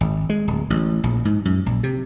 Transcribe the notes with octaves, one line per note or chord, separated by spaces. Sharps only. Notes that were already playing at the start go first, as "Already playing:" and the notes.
G#1
G#3
D1
A1
A#1
G#2
F#2
A#1
C3